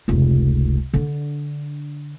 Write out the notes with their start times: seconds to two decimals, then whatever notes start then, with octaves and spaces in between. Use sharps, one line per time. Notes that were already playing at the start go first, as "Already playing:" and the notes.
0.08 F1 C#2
0.94 D3 D4